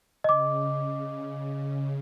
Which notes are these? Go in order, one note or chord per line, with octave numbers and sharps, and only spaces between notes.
C#3 D#5 D6